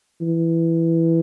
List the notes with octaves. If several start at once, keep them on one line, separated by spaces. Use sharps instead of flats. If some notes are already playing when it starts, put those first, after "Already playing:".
E3